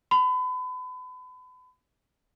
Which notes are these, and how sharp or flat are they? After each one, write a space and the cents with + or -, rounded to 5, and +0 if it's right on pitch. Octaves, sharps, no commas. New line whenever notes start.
B5 +35